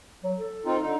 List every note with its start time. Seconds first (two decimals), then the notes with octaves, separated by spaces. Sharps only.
0.24 F#3
0.38 A4
0.66 C4 D#4 F4
0.82 D3 D#4